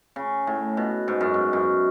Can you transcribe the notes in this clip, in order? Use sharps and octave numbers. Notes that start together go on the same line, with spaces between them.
C#3
A2
B2
G#2
F#2
G#2
F#2